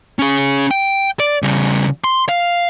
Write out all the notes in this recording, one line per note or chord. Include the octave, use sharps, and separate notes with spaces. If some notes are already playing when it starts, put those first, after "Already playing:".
C#4 G#4
G5
D5
C#3 G3
C6
F5